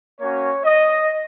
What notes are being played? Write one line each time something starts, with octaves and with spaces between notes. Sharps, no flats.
A#3 C#4 F#4 C#5
D#5